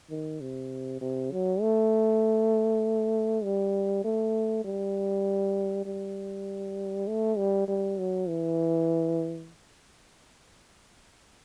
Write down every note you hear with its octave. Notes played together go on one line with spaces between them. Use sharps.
D#3
C3
C3
F#3
A3
G3
A3
G3
G3
A3
G3
G3
F#3
E3